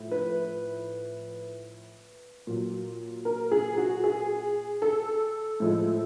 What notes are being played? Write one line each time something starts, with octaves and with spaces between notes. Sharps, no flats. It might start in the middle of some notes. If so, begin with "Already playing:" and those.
Already playing: A2 F3
B4
A#2 F#3
A#4
G#4
F#4
G#4
A4
A2 F3 G#3